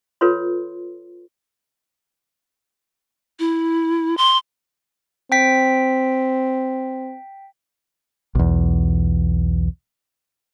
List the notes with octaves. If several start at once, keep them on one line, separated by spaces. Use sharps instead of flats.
F4 A4 B4 C#5 C6
E4
C6
C4 G5 B6
B1 E2